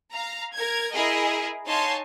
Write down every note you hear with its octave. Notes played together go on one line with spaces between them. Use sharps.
F5 A#5
A#4 G#6
E4 G#4 A#4 D#5
D#4 C#5 F5 G#5 A5 C6